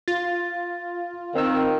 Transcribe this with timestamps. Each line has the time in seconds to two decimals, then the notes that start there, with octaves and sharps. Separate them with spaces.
0.08 F4 A6
1.35 D#3 C4 E6